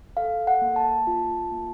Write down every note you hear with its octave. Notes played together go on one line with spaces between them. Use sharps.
A4 F5
F#5
A#3
A5
F4
A#3